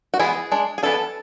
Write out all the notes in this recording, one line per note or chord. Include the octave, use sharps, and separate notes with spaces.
F#4
E3 G#3 B3 E4 G#4
G#3 D4
G#4
E3 B3 D4 A4